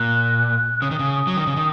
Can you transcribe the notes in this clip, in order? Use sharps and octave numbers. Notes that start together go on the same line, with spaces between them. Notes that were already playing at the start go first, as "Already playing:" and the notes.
Already playing: A#2 F#6
C#3 D#6
D#3
C#3
F#3
D#3
C#3
D#3